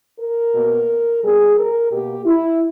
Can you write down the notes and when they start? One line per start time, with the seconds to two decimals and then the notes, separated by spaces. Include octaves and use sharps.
0.20 A#4
0.55 B2 A#3
1.23 A#2 G3 B3 G#4
1.57 A#4
1.91 B2 A#3 G4
2.26 E4